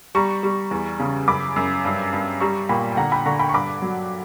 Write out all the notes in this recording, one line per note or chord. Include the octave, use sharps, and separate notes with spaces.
G3 A#5 C#6
G3
E2
C#3
F#2 B5 D6
F#2
G2
G2
G3 A#5 C#6
A#2 G5 B5
G5
D3 F#5 A#5
G5 B5
D3 A#5 C#6
G5 B5
C#6
G2 B5 D6
F#3